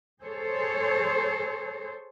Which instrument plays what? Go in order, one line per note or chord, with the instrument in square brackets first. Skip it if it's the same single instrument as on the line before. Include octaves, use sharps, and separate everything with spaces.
[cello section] G#4 A4 C5 C#5